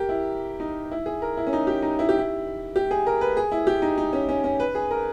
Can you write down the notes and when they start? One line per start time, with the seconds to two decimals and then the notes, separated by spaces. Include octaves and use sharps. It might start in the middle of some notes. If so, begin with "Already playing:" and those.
Already playing: G4 A#4
0.09 E4
0.60 D#4
0.91 E4
1.06 G#4
1.22 A#4
1.37 E4
1.47 C#4
1.53 D#4
1.67 G4
1.82 D#4
1.99 E4
2.09 G4
2.19 E4
2.76 G4
2.91 G#4
3.06 A#4
3.21 B4
3.37 G#4
3.52 E4
3.67 G4
3.82 D#4
3.98 D#4
4.13 C#4
4.29 C#4
4.44 C#4
4.60 B4
4.75 G#4
4.91 A#4